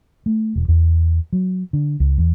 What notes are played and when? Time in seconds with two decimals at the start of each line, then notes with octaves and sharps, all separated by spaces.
0.26 A3
0.56 E1
0.68 E2
1.33 F#3
1.73 D3
2.00 C#2
2.18 E2